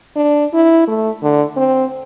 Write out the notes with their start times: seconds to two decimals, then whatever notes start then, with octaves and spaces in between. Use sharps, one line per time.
0.16 D4
0.54 E4
0.88 A3
1.23 D3
1.57 C4